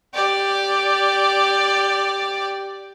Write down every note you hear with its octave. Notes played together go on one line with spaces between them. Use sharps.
G4 D5